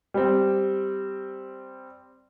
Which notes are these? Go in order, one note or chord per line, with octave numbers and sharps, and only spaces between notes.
G3 C4